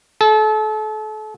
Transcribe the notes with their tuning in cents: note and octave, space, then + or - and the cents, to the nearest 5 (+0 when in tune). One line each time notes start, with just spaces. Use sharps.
A4 -35